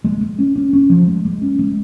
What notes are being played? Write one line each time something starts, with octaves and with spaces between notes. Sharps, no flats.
G#3
G#3
C#4
C#4
C#4
F3
G#3
G#3
C#4
G#3